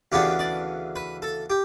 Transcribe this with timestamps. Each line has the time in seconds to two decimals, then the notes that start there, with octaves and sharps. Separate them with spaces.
0.12 D2 C#3 E3 B3 D4 G4
0.39 D5
0.96 B4
1.22 A4
1.50 G4